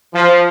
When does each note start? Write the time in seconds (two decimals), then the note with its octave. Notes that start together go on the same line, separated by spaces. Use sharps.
0.13 F3